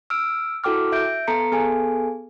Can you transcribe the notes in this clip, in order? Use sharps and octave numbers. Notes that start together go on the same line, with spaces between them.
E6 F6 D7
E4 F#4 A4 G5 D6 F6
E5 G6 D7
B3 A4 A#5 C#7
B3 G#4 A4 G#5